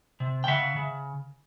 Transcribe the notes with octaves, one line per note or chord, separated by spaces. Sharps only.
C3
G5
C#3 E5 F#5
C#3